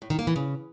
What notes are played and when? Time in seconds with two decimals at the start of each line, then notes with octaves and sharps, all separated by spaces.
0.02 A2
0.10 D#3
0.19 A#3
0.27 E3
0.36 C#3